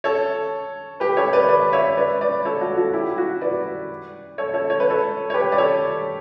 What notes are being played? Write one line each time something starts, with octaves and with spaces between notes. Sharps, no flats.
A4 C#5
G4 B4
A4 C#5
B4 D5
B4 D5
C#5 E5
B4 D5
B4 D5
A4 C#5
F#4 A4
F#4 A4
E4 G4
F#4
B4 D5
A4 C#5
A4 C#5
C#5
B4
A4 C#5
C#5
G4 B4
D5
A4 C#5